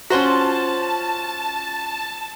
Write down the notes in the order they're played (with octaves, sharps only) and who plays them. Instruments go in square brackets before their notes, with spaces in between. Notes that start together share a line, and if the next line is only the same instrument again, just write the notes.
[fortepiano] C#4 F#4 [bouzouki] F4 C5 A#5 [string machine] A5